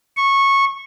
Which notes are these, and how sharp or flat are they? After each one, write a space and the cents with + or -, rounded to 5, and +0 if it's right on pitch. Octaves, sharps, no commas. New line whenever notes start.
C#6 -15